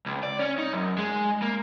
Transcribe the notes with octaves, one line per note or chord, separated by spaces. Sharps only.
C#2
D5
C#4
D#4
F#2
G#3
A#3